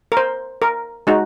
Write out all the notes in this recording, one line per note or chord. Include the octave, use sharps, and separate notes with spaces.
A#4
C5
A#4
G#3 D#4 F#4